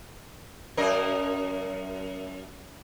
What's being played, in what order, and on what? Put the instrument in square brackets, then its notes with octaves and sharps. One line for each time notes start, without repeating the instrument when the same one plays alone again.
[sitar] F#2 A#4 D#5